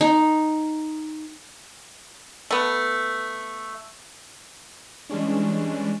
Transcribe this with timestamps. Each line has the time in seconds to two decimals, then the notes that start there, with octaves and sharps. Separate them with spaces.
0.01 D#4
2.51 A3 B3
5.10 E3 G3 G#3 C#4 D4